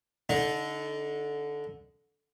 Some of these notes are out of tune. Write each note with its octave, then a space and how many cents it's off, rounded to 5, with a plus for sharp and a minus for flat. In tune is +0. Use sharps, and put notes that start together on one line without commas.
D3 -10 D#4 +15